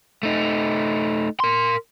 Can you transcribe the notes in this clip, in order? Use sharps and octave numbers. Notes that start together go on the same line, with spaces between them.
A3 D#4
A#4 C6